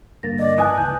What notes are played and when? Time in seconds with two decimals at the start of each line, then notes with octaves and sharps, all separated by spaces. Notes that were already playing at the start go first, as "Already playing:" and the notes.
0.23 G2 D3 A#3 A6 A#6
0.39 D5 D#5
0.58 E3 B4 G#5 A5 D#6 F#6
0.78 C#2 G6